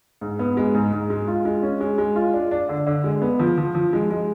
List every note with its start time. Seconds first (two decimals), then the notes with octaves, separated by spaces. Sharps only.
0.21 G#2
0.39 B3
0.57 G#3
0.75 G#2
0.92 G#2
1.10 G#3
1.28 F4
1.45 G#3
1.62 C#4
1.80 G#3
1.98 G#3
2.16 F4
2.34 D4
2.51 D4
2.69 D3
2.87 D3
3.04 G#3
3.22 B3
3.39 F3
3.58 F3
3.75 F3
3.93 G#3
4.10 G#3